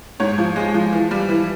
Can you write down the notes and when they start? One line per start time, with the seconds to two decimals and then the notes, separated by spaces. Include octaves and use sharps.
0.20 G#2 C#5
0.38 F3
0.56 G#3
0.74 F3
0.93 E3
1.11 G3
1.29 E3